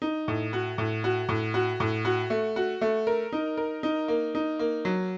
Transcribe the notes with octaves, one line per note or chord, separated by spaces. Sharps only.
D#4
A2
F#4
A2
F#4
A2
F#4
A2
F#4
A3
F#4
A3
A#4
D#4
A#4
D#4
A#3
D#4
A#3
F#3